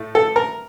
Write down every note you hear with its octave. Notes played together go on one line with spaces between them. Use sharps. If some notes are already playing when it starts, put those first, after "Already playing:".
Already playing: A2 A3
A4
A#4